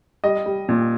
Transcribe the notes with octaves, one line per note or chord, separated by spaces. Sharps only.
G3 D#5
G3
A#2